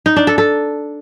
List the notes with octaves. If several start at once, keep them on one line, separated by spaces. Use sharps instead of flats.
D#4
D4
A4
A4